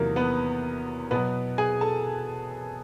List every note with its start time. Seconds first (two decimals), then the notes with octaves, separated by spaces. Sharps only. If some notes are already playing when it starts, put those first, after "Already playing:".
Already playing: E2 C3 D#3 F#3 A#3 A#4
0.16 B3 B4
1.11 B2 F#3 B3 B4
1.58 G#4 G#5
1.81 A4 A5